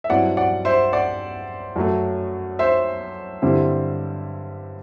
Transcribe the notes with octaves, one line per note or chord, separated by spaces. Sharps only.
E5
G2 F#3 C4 E4 D5 F#5
D5 F#5
C5 E5
D5 F#5
F#2 F#3 A3
C5 E5
G2 D3 G3 C4 E4